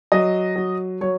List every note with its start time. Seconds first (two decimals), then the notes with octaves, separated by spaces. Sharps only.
0.12 F#3 D#5
0.56 F#3
1.01 F#3 C#5